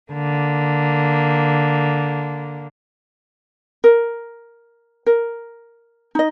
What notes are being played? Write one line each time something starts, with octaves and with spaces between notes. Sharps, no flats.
D3 A#3
A#4
A#4
D#4 D#5